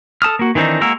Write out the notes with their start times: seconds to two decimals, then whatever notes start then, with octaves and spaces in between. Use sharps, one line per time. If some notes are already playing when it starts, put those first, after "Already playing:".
0.22 A4 A5 D#6 F6
0.39 A#3 F#4
0.55 D#3 E3 C4 D4 D#4
0.81 G#3 A#3 F#4 A#4 E6